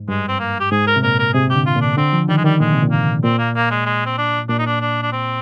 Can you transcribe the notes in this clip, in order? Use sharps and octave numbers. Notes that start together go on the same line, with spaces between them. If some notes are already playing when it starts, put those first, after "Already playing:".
Already playing: G#2
G2 G#3
C4
A#3
G4
G#2 G#4
A#4
C3
A#2 A#4
A#4
C3 G#4
G4
D3
F4
A#2 D4
D3 C4
F3
D#3 G3
G#3
D#3 G3
A#2 G#3
C3
A#2
G#2 A#3
A#2 C4
A#3
A#3
G#3
G#3
C4
D4
A#2 D4
D#4
D4
D4
D4
C4